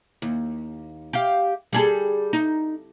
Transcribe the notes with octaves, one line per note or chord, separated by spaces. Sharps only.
D#2
G4 F5
G3 G#4 A4
D#4